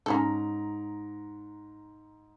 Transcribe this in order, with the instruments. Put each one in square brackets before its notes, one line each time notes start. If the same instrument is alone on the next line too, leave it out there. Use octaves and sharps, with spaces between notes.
[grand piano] G#2 A#5 [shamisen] C#4 G#4 A4